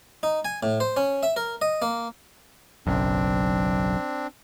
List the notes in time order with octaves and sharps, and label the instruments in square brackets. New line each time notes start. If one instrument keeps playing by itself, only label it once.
[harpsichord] D#4
G#5
A2
C5
C#4
E5
A#4
D#5
A#3
[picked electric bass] F#1 B1 F#2 [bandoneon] C4 D4